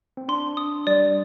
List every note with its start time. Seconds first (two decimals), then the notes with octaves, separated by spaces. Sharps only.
0.17 C4
0.28 D4 C6
0.57 D#6
0.87 G3 D5